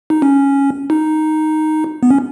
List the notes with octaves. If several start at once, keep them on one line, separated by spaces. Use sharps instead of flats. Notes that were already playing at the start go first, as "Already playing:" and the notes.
D#4
C#4
D#4
B3
C#4